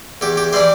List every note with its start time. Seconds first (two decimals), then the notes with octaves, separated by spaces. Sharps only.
0.21 E2 G4
0.37 G4
0.53 E3 G3 D4 C5